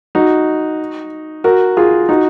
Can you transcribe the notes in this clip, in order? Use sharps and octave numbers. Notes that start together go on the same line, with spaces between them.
D#4 F#4
F#4 A#4
F4 G#4
D#4 F#4